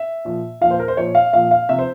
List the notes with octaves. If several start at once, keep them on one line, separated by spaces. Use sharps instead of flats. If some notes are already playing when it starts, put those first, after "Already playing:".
Already playing: E5
A#2 F3
A#2 F3 F5
C5
A#4
C5
A#2 F3 C#5
F5
A#2 F3 F5
F5
C3 F3 E5
C5